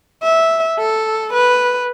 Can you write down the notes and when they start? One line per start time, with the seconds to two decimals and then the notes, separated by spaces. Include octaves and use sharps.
0.23 E5
0.79 A4
1.33 B4